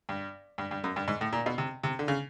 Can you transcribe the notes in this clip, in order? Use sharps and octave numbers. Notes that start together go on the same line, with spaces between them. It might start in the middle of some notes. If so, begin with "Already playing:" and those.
G2
G2
G2
F#2
G2
G#2
A2
A#2
B2
C3
C3
D3
C#3